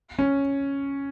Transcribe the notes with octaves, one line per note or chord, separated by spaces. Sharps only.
C#4